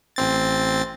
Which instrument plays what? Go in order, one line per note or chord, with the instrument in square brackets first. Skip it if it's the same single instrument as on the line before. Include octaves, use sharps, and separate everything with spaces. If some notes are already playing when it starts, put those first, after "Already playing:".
[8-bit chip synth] A1 C4 A6